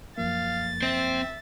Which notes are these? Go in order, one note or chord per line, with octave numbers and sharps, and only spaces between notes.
F#2 F3 A#3 F5 A6
C4 C5 E5